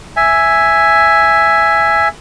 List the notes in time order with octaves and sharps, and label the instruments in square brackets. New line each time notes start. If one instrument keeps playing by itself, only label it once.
[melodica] E5 G#5